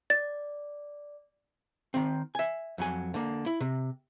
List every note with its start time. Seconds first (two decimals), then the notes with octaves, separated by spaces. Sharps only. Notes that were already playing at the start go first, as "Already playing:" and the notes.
0.10 D5 A6
1.94 D#3 C4
2.35 E5 G#5
2.78 F2 F#3 G#5
3.14 D3 A#3
3.46 E4
3.60 C3